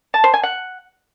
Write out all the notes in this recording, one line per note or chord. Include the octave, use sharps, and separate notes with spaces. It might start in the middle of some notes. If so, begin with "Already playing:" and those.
A5
C5
G#5
F#5